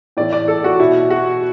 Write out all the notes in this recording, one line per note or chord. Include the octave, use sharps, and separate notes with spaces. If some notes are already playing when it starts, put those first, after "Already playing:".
A2 E3 D5
D5
A4
F#4
B2 E4
F#4